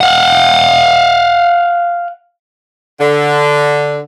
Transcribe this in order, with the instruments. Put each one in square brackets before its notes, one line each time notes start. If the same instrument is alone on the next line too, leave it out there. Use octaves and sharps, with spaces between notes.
[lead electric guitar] F5 F#5
[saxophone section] D3